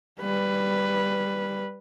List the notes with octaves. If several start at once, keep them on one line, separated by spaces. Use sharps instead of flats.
G3 B4